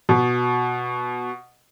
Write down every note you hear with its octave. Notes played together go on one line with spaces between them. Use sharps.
B2